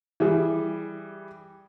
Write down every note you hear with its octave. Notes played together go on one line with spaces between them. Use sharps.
E3 G3 G#4